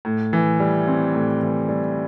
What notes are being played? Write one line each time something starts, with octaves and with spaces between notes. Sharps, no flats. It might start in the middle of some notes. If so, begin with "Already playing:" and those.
A2
E3
G3
C4
A2
E3
G3